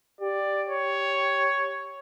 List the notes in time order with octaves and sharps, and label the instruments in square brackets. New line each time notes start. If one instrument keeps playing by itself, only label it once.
[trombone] G4 [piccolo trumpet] D5
[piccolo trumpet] C#5